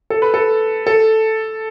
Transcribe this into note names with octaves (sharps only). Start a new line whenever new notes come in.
A4
B4
A4
A4